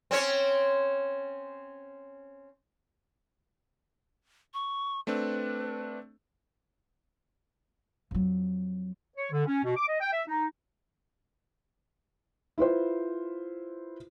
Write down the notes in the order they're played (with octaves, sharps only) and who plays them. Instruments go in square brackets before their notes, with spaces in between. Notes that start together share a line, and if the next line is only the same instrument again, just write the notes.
[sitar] C4 C#4 C#5
[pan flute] C#6
[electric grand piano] A3 C4 D4 [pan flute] B4
[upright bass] F2 F#3
[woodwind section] C#5
D3
C#4
B2
D6
D#5
G5
E5
D#4
[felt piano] E4 F4 B4 C5